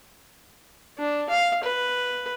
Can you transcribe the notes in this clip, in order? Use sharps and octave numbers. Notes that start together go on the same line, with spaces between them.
D4
F5
B4